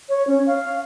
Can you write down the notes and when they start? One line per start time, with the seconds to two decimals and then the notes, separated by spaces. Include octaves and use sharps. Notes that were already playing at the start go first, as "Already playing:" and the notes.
0.09 C#5
0.27 C#4
0.47 F5